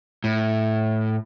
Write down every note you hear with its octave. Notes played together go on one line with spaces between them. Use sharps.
A2